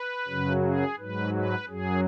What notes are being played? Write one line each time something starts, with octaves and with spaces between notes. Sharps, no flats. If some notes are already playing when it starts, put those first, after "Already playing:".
Already playing: B4
F#2 C#3 F#3
G#4
G#2 F#3 B4
B4
F#2 F#3 G#4